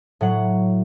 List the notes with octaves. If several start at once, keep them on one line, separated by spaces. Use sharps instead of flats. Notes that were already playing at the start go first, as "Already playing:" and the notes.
A2 F#3 F#5